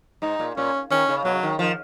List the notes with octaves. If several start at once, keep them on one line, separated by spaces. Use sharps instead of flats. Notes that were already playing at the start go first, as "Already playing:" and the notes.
G#2 D#4
A#2
A#2 C#4
D#3 C#4
C#3
B2 F#3
C#3
D#3
D#3 F3